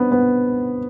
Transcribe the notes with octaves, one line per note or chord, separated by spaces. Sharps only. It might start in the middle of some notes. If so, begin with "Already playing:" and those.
Already playing: B3 C4 D4
B3